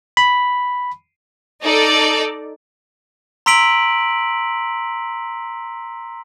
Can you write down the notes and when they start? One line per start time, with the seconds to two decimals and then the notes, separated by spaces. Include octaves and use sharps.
0.17 B5
1.62 D#4 A4 D5
3.46 A#5 C6 E6 B6 D7 F#7